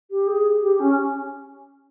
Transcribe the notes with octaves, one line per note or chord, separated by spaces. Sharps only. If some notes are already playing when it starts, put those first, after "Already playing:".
G4
G#4
G4
C#4